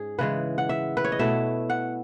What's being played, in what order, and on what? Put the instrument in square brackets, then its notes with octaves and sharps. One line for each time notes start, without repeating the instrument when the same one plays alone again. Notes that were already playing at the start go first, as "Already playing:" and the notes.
Already playing: [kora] G#2 C#4 G#4
C#3 E3 G#3 B4
F#5
E5
B4
C#5
D#5
B2 A3 E4 E5
F#5